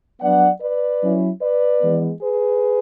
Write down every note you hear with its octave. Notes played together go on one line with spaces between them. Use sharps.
F#3 B3 D4 D5 F#5
B4 D5
F#3 C#4 E4
B4 D5
E3 G#3 B3
G#4 B4